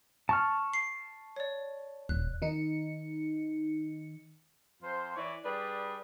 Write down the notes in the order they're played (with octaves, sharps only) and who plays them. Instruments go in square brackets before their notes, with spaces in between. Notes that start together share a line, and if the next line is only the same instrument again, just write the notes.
[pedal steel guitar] A5 C#6 F6
[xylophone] C7
C#5 D5
[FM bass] D#1 [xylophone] F#6
[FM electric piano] D#3 D#4 C#7
[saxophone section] F2 F4 C5
E3 C#5 D5
G3 D4 G#4 B4 D5